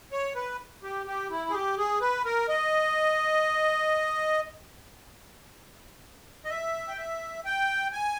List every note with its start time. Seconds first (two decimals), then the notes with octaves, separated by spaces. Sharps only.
0.12 C#5
0.35 B4
0.83 G4
1.07 G4
1.30 E4
1.50 G#4
1.54 G4
1.77 G#4
2.01 B4
2.25 A#4
2.49 D#5
6.45 D#5
6.50 E5
6.88 G5
6.98 E5
7.45 G5
7.93 G#5